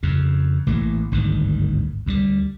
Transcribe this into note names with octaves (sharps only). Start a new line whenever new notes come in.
F2 C#3
A1 E3 A3 A#3
G#1 D2 G2 D#3
D2 D3 G3